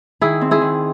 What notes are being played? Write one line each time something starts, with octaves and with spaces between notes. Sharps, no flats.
D#3 E4 G#4
C4
E4 G#4
D#3